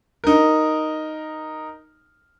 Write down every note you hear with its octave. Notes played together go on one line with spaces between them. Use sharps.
D#4 A#4